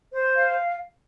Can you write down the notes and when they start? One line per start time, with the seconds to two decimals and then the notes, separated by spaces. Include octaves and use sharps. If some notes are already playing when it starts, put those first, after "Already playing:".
0.13 C5
0.35 F5